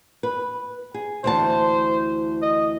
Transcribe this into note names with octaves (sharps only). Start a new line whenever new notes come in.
B4
G#4
D2 E3 C5 A5
D#5